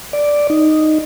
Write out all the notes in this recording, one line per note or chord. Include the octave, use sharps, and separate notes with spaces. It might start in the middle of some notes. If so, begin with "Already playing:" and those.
D5
D#4